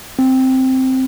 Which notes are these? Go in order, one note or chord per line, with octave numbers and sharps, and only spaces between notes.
C4